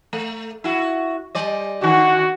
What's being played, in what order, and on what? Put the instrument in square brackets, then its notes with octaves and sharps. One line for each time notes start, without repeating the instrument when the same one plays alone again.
[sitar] A3
E4 F#4
G3 D5 D#5
[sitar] D3 D#3 [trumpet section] F#4